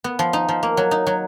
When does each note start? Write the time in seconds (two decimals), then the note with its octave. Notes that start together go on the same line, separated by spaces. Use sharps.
0.04 B3
0.19 F3
0.33 D#4
0.49 F3
0.63 A#3
0.77 F#3
0.91 D#4
1.07 F#3